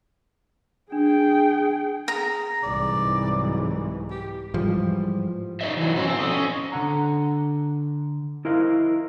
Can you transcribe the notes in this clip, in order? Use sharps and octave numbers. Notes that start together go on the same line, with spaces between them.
D4 G#4 G5
G#4 A#5
C2 G#2 E3 D5
F#3
G4
G#2 E3 F3 G3
D#4 F#4 C5 C#5 D#5 E5
E3 F#3
B2 F3 F#3 C#4 C5 C#5
C4
D3 D#5
C#4
D3 F#5 A#5
E4 A#4 C5 D#5 F5